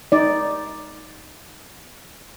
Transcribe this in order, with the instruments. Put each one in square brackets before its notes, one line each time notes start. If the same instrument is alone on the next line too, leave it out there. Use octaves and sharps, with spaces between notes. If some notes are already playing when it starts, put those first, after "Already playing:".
[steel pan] D#4 D5